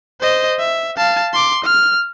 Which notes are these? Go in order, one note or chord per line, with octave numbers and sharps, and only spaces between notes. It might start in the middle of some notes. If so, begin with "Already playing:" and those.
C5 D#5
E5
F5 A5
C6 D6
F6